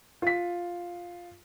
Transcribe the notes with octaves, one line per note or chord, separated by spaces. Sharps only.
F4 B6